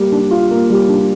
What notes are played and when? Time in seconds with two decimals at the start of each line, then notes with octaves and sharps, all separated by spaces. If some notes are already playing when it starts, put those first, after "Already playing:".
Already playing: G3 A#3
0.12 D4
0.31 F4
0.51 A#3
0.70 G3
0.89 D4